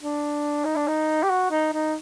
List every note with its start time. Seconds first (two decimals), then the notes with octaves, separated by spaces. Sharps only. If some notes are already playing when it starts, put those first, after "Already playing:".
0.01 D4
0.65 D#4
0.76 D4
0.88 D#4
1.23 G4
1.29 F#4
1.51 D#4
1.73 D#4